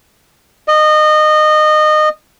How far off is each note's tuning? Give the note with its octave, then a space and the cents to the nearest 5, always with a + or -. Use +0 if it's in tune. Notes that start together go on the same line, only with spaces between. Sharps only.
D#5 -25